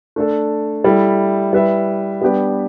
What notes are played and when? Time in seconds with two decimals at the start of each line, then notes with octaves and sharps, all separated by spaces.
0.16 A3 D4 A4
0.84 G3 E4 A4 E5
1.53 G3 E4 B4 E5
2.22 G3 B3 D4 G4 B4